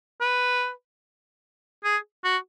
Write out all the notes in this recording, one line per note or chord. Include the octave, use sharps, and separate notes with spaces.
B4
G#4
F#4